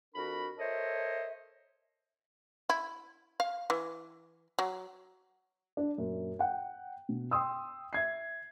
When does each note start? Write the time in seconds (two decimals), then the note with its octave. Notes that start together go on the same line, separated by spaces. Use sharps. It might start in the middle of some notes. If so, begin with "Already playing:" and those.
0.15 F2 D4 F#4 A#4 B5
0.58 A4 A#4 C5 C#5 D#5 E5
2.70 E4
3.40 F5
3.70 E3
4.59 F#3
5.77 D4
5.98 F#2 A#2
6.39 F#5 G5
7.09 B2
7.31 G5 C6 D#6 E6
7.93 E5 G#6 C7